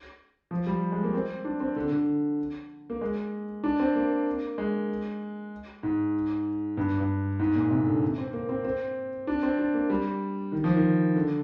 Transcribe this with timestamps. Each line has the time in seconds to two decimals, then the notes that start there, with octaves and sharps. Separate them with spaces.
0.51 F3
0.67 G3
0.92 G#3
1.04 A#3
1.14 C4
1.45 D4
1.60 C4
1.76 D3
1.92 D3
2.90 A#3
3.01 G#3
3.64 D4
3.80 C4
3.95 A#3
4.58 G#3
5.83 G#2
6.77 G2
7.00 G2
7.39 G#2
7.55 A#2
7.71 C3
7.87 D3
8.18 C4
8.33 A#3
8.49 C4
8.65 C4
9.27 D4
9.43 C4
9.59 D4
9.74 A#3
9.90 G3
10.52 D#3
10.64 F3
10.76 D#3
11.15 D3